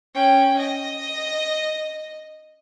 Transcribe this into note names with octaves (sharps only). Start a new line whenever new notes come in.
C#4 G5
D#5